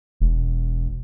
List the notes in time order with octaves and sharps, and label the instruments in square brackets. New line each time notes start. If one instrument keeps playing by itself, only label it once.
[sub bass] E1